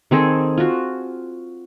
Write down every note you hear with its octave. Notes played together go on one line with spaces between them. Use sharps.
D#3 C4 G#4 A4
F4 F#4